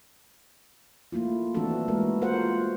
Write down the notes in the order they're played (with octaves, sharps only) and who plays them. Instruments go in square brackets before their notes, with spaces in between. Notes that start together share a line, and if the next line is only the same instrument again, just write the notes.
[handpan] A3 A#3 E4 F4
E3 A3 C4 D4 F#4 A4
G#3 A#3 E4 A#4
F4 F#4 A#4 C5 F5 F#5